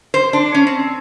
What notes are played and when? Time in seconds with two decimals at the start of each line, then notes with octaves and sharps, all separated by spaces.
0.14 C5
0.33 D4
0.54 C#4
0.67 C4